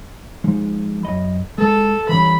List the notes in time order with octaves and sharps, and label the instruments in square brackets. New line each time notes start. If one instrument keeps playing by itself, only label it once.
[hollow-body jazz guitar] F3 G#3 D#4
F#2 D#5 B5
[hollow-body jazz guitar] G#3 [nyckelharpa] A4
[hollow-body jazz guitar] E3 G3 C#4 [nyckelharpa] B5